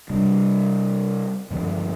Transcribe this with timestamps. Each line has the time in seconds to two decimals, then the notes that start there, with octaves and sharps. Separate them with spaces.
0.10 C3 G3 D4
1.51 G2 D3 F3 G#3